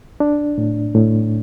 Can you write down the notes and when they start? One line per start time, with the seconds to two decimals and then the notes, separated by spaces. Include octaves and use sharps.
0.20 D4
0.58 A2
0.95 A2